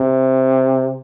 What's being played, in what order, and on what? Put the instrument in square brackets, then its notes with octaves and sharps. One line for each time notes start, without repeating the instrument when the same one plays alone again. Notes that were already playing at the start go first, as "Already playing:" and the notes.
Already playing: [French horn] C3